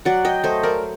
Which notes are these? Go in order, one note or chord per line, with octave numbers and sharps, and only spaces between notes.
F#3 D5 F#5
D#5 G5
A3 C5 D#5
A#4 D5